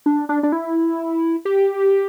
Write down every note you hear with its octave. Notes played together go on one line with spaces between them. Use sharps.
D4
D4
D4
E4
G4